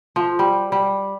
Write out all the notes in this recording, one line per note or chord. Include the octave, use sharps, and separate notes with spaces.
F3
G3
G3